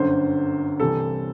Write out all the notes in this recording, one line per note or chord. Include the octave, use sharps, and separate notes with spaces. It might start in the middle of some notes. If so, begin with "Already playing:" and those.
Already playing: G1 F#2 D3 C5
C2 C3 E3 A4